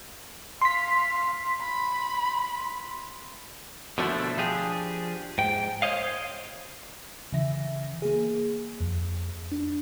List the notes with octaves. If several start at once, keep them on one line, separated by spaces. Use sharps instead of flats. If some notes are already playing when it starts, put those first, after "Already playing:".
F5 C6 B6
B5
B2 D3 F3 A3 D4 E4
F3 D4 G4 G#4
G#2 G5
C5 C#5 D#5 F5
C#3 E3 E5 A#6
A#3 G#4
F2
D4